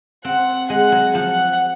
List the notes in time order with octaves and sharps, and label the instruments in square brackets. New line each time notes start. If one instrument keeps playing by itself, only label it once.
[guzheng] C4 [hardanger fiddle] F#5
[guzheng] G#3 [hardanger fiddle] F#5
[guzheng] F#3
[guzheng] F3 [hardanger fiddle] F#5